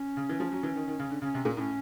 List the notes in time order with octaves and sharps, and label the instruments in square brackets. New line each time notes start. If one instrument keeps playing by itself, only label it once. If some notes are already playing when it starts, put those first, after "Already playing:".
Already playing: [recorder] C#4
[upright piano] C#3
E3
F3
F#3
E3
D#3
D#3
C#3
D3
[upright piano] C#3 [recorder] C#4
[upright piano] C3
A#2
[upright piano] A2 [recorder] C#4